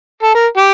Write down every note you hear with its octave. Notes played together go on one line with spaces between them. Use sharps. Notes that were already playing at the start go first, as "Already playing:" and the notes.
A4
A#4
G4